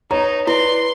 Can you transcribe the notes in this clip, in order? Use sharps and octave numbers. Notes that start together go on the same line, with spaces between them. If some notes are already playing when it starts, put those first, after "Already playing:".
B3 D#4 C#5 A#5
E4 B4 D5 C6